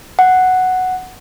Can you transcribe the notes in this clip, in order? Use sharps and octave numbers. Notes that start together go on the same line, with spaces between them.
F#5